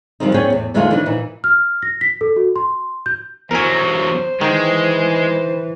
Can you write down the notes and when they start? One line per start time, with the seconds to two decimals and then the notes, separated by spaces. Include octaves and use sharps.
0.20 D#3 F3 G3 G#3 C4 D#4
0.34 B3 C#4 G#4 C#5 D5 G5
0.50 E2 A2
0.74 E2 D3 G#3 A3 D#4 F4
0.90 D#3 E3 G3 D4 B4
1.06 A#2 E3 D#4
1.44 F6
1.82 A#6
2.01 B6
2.21 A4
2.36 F#4
2.56 C6
3.06 G6
3.51 E2 F#3 A#4 C5 G#5
4.41 D#3 E3 G#3 G5